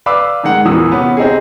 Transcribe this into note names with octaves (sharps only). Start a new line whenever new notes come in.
B4 D5 F5 B5 D6 E6
G#2 D#3 G#3 F#5
E2 A#2 E3 D#6 E6
C3 B3 C#4
C4 D#4 G4 G#4